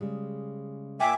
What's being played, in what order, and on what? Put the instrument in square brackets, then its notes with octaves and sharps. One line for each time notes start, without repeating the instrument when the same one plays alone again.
[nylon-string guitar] C#3 G3 G#3
[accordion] A#2 E5 D6 [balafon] G5 [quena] G#5